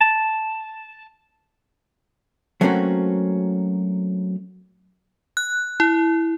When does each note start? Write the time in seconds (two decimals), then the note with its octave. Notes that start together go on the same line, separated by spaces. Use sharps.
0.01 A5
2.61 F#3 A3 A#3 C4 C#4 F#4
5.37 F#6
5.80 E4